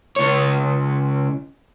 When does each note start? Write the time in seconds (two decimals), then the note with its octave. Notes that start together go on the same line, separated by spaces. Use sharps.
0.16 C#2 C#5